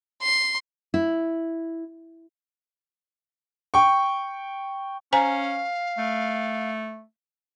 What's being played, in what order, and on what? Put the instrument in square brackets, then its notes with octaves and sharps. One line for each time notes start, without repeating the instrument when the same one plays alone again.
[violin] C6
[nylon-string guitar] E4
[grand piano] G5 C#6
[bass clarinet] C#4 [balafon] C5 G#5 A#5 [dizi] F5
[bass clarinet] A3